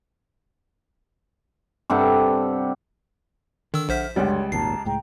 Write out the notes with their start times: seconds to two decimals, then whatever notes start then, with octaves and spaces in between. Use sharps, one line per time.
1.90 G2 C3 A4 F#5
3.74 D3 D#3 E6
3.89 A#1 C5 E5 F#5 F6 B6
4.16 C#2 F#2 D3 G3 C#5 F#5 C6
4.52 G#1 D#2 A#2 A5 A#5 C7
4.85 C#2 A2 G#3 G5 A#5